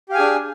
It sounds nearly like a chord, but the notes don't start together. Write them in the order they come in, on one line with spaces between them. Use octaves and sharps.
G4 F5 G#5 G#4 D4